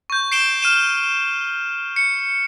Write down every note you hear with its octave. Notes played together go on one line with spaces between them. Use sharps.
C#6 G6
C7 D7 E7 G7
F6 D#7 E7
C#7